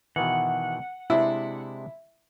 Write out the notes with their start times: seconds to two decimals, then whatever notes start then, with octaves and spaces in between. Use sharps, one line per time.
0.16 B2 D#3 E3 F#5
1.10 C3 G#3 D4 E4